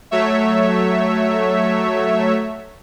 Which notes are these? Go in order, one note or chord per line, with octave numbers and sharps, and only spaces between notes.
F#3 A3 C#5 E5